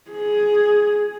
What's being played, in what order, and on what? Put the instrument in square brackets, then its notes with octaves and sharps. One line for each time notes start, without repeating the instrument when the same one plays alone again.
[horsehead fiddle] G#4